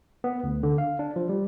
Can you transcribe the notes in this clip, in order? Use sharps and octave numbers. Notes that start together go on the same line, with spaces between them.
B3
D2
D3
F5
D4
F3
G3